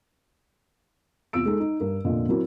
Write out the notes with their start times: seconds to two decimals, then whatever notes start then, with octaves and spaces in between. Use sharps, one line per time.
1.33 E2 C3 F4 E6 D7
1.46 G#3 D#4 A4
1.60 D#4
1.80 G2 A#4
2.05 F1 A#2 D3 F4 D#5
2.29 F#3 C4 E4 F#4 A#4